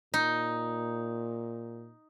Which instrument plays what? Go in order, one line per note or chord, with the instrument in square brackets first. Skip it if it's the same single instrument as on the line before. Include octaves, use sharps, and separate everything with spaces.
[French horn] A#2 [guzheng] D#4